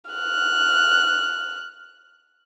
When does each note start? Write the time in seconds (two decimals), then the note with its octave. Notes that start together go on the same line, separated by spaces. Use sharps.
0.11 F6 F#6